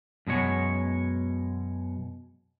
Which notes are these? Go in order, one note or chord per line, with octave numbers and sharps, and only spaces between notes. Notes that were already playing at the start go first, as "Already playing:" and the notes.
F#2 B2 G#3 C#5